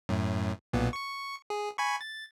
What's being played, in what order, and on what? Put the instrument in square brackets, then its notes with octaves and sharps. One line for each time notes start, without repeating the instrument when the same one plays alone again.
[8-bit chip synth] F#2 A2
B1 A#2 B3
C#6 C#7
G#4
G#5 B5 C#6
A6